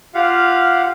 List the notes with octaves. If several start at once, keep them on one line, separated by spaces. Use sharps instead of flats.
F4 G4 F5 F#5